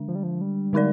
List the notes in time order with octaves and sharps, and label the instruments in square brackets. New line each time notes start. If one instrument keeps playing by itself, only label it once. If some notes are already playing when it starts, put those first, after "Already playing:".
Already playing: [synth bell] D3 G#3 D4
[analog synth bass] F3
G3
F3
G3
[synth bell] D3 G#3 D#4 A#4 D5